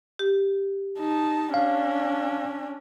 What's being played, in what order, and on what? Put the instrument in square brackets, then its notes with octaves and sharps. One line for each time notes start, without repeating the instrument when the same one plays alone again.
[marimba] G4
[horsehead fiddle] D#4 A5
[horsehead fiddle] C#4 D4 [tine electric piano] F5